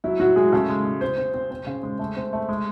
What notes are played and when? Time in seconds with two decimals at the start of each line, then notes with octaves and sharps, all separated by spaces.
0.04 F#3 E4
0.19 A2 F#3 F#4
0.36 A2 G#3 G#4
0.52 C#3 A3 A4
0.69 G#3
0.85 G#3
1.01 C4 C5
1.17 C4
1.34 C4
1.51 C4
1.67 C#3
1.83 G#3
1.99 A3
2.16 C4
2.33 A3
2.49 G#3